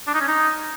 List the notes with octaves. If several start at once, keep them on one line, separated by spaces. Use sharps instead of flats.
D4
D#4
C#4
D#4